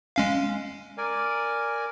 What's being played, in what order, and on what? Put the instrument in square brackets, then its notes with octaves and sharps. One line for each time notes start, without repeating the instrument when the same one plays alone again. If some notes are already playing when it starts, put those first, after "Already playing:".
[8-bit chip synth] G#3 C#4 F5
[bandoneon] A#4 D5 G#5